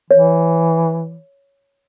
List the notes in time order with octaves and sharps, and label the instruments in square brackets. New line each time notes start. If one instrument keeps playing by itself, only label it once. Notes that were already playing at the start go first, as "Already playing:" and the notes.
[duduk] E3 [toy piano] C#5